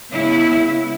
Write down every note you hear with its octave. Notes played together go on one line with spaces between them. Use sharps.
C#3 G#3 B3 E4